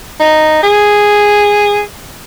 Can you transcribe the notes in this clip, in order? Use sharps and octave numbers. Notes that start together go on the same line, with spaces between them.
D#4
G#4